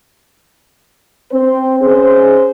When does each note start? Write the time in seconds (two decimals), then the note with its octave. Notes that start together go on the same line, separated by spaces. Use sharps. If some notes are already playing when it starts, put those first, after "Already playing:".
1.32 C4 C5
1.80 C#4 G#4 C5